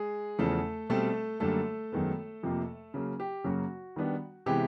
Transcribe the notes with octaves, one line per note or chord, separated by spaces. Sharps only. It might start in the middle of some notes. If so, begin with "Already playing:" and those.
Already playing: G#3 G#4
E2 C#3 F3 A3 A4
B2 G3 A3 C4 A4
F#2 D3 G3 A3 A#3 A4
F#2 D#3 G#3 B3
F2 C3 F3 A#3
C#3 F#3 A#3
G4
F#2 C#3 F#3 A#3 F#4
D#3 G3 B3 D4
C3 E3 G#3 B3 G4